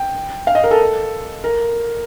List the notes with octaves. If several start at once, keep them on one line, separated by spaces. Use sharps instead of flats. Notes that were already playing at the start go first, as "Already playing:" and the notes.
Already playing: G5
F5
D#5
A#4
A4
A#4